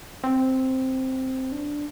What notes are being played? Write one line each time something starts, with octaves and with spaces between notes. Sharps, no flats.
C4
D4